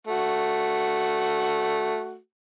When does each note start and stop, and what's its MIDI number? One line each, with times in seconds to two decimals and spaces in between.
0.07 2.18 57
0.07 2.18 66